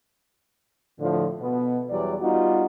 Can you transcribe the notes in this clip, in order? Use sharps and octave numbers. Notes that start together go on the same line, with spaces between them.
A2 D3 F3
B2 B3
E2 E3 F#3 G3 D5
G3 B3 D#4 F4 F#4